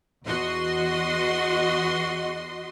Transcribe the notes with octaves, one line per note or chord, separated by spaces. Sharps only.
E2 F#4 D#5 C6